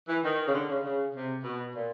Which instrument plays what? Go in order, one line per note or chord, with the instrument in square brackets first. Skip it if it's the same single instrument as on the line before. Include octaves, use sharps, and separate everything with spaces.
[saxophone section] E3
D#3
C#3
D3
C#3
C#3
C3
B2
A#2